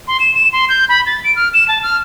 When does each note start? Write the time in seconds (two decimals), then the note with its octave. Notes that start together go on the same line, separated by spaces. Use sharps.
0.08 C6
0.20 E7
0.34 E7
0.53 C6
0.69 G6
0.89 B5
1.06 A6
1.24 D7
1.36 F6
1.54 E7
1.68 A5
1.83 F6